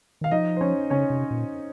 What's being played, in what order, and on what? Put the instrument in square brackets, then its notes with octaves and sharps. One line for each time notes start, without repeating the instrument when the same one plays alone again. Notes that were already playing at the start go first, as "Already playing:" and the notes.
[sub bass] D#3 [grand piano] F5
[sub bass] F3 [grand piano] D#4 D#5
[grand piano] C5
C#4 C#5
[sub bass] C#3 [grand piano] C#4 C#5
[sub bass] C3
A#2